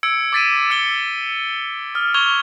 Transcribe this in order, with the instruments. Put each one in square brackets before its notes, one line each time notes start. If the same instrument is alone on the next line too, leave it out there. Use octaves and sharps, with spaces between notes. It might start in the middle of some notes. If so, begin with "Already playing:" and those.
[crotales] E6 G#6 C#7 D7
D6 G#6 A6 B6 D7 D#7
E6 C#7 G7
D#6 F6
C#6 G#6 F7 G7